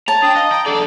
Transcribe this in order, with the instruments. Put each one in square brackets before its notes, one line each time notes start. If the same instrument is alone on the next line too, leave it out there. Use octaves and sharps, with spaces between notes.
[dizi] C#5 [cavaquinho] A5 [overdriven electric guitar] A#5
[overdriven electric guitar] D4 [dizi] G5 [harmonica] D#6
[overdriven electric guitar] D#5 [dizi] F5
[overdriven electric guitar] G5 [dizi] A#5
[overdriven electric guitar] D4 G#4 [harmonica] A4 D5